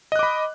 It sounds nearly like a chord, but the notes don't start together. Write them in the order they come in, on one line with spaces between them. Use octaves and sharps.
D#5 F#6 D6 B5